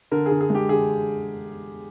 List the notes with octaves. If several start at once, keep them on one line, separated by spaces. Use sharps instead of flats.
D3 A#4
G#4
D3
G#4
G#3 G4
D3 G#4